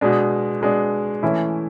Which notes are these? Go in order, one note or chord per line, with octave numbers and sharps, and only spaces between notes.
B2 G#3 D4
B2 G#3 D4
E3 A3 C#4 E4